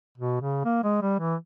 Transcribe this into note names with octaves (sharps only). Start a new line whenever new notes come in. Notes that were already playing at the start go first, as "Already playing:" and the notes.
B2
C#3
A#3
G#3
G3
E3